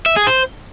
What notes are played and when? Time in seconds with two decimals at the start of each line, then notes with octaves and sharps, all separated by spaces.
0.06 E5
0.16 G#4
0.27 C5